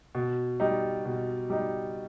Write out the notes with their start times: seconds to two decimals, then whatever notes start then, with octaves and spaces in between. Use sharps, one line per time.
0.15 B2
0.60 G3 D#4
1.05 B2
1.50 G3 D#4